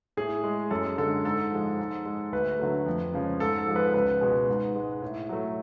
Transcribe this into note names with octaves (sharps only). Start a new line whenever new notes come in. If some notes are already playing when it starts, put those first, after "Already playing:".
A2 G#4
G#3
F#2 A4
D3 G#3 A4
G#2 A4
F3 G#3
G#2
G#3
D2 B4
D3 F#3 A3
F2
C#3 F3 G#3
G#2 A4
A4
F3 G#3
B4
C#2 B4
B2 G#3
G#2
G#3
A2
F#3 A3